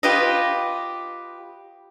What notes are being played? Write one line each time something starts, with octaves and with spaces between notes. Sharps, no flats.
F4 G4 B4 D#5